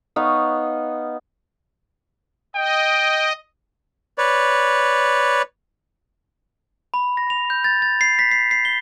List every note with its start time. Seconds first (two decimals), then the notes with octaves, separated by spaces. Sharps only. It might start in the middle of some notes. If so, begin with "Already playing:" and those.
0.16 B3 D#4 C#5 F5
2.56 D#5 G5
4.18 B4 C#5 D5
6.94 B5
7.17 A#6
7.30 F7
7.50 G6
7.64 A6
7.82 A6
8.01 C7
8.19 B6
8.31 C7
8.51 C7
8.65 G7